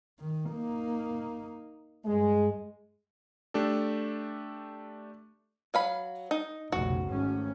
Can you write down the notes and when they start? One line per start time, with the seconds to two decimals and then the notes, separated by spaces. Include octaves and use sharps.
0.20 D#3
0.49 A#3 D#4
2.05 G2 G#3
3.54 A3 D4 G4 A4
5.74 F#3 F5 B5
6.31 D#4
6.72 F1 B1 C#3 F#4
7.08 G#1 A3 C#4